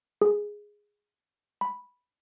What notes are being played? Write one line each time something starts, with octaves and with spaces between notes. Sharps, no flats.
G#4
B5